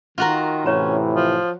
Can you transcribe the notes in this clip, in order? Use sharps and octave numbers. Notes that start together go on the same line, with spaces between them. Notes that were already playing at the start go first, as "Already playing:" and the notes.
D#3 F4 F#4 A#4
A2 C3 E3 C#4 C#5 A#5
F3